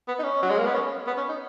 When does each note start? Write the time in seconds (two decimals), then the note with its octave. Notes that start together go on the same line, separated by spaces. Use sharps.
0.08 B3
0.19 D#4
0.24 C#4
0.42 F#3
0.50 G#3
0.58 A#3
0.65 B3
0.74 C#4
1.07 B3
1.17 C#4
1.29 D#4